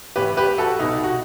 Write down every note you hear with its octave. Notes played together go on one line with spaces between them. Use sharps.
A1 A2 E3 G4 B4
G4 B4
F#4 A4
C2 B2 D#4
F#4